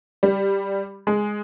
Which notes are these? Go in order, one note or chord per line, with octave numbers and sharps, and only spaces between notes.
G3
G#3